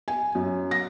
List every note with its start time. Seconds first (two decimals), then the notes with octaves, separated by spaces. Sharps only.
0.08 G#5
0.35 F#2
0.71 A#6